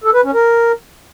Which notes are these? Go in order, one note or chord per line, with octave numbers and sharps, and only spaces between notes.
A4
B4
C#4
A#4